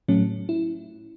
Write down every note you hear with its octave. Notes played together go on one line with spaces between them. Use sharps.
A2 F#3 A3 C#4
E4